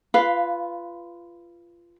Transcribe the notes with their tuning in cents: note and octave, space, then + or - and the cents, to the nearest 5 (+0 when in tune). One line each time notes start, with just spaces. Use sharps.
F4 -20 B4 +0 F5 +0